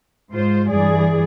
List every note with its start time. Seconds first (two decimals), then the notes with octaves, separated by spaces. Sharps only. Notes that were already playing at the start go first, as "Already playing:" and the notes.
0.33 G#2 F4 C5
0.70 G2 E3 G#4 D5